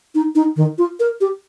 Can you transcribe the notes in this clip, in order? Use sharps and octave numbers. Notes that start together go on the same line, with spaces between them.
D#4
D#4
D#3
F4
A#4
G4